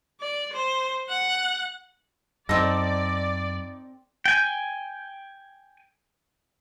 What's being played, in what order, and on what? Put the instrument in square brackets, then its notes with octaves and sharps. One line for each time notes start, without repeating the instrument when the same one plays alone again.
[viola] D5
C5
F#5
[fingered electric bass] F#2 [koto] C4 A4 [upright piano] D#4 A#6 [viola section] D5
[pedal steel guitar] G5 G#5